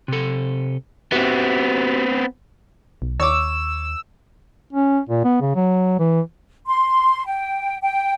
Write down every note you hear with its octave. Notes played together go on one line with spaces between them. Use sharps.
C3 A4
B3 C4 F#4 G4 E5
B1
D#2 C#5 D6 E6
C#4
A#2
B3
C#3
F#3
E3
C6
G5
G5